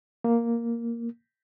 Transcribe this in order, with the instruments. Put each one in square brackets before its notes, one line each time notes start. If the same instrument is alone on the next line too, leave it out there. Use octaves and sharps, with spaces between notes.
[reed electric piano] A#3